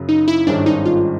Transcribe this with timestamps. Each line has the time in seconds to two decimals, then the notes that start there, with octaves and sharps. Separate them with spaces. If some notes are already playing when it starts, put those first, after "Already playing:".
Already playing: F#2 C#3 F#3
0.09 D#4
0.28 E4
0.47 G#1 G2 D#3 G#3 C#4 D4
0.66 D#4
0.86 F4